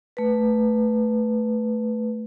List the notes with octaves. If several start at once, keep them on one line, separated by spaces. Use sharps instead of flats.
A3 B4